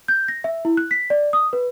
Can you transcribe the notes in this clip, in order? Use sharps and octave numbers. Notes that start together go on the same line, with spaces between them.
G6
A#6
E5
E4
F#6
B6
D5
D#6
B4